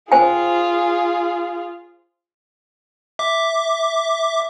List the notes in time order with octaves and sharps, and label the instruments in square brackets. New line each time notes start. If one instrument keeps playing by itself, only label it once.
[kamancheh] F4 G#4 [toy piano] C5 G5 G#5
[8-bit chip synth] E5 D6